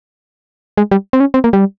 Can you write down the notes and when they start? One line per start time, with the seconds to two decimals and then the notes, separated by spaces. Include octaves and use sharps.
0.78 G#3
0.91 G3
1.13 C4
1.20 C#4
1.34 C4
1.44 A#3
1.53 G3